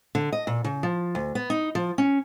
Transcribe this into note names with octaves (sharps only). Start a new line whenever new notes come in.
D3
D#5
A#2
C#3
F3
D2
B3
D#4
F3
C#4